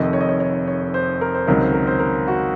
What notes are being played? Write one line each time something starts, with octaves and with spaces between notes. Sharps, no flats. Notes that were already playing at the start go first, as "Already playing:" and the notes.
Already playing: F1 F2 D#3 D#5
C#5
D#5
C#5
C#5
C#5
C5
A#4
C5
C#2 C3 D#3 F#3 A#4
C5
A#4
C5
A#4
F#4